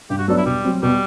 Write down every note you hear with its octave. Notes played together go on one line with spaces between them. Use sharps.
G2 G4
F#4
F#3 B3 D4 A4
E4
B2 G3
F#3 C4
B2 G3